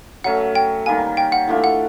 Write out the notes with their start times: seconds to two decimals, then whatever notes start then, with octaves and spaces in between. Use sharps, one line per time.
0.24 F#3 A3 C#4 F#5
0.55 G5
0.86 D#3 G3 A#3 G#5
1.17 G5
1.32 F#5
1.48 E3 A3 D4 F4
1.64 F#5